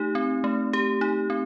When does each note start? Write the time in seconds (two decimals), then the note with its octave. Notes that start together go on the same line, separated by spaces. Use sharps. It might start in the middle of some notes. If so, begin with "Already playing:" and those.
Already playing: A3 D#4 G4
0.15 C4
0.44 A3
0.73 G4
1.01 D#4
1.30 C4